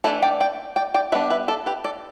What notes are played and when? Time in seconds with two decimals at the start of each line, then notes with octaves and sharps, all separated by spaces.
0.04 E3 A3 D4 E4 A4
0.22 D5 G5
0.40 D5 G5
0.76 D5 G5
0.94 D5 G5
1.12 G3 B3 D4 B4 E5
1.30 B4 E5
1.48 A4 D5
1.66 G4 B4
1.84 A4 D5